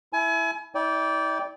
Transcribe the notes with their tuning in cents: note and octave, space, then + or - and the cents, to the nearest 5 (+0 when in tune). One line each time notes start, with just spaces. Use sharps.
E4 +0 G#5 +35
E4 -45 D5 -25 G5 +0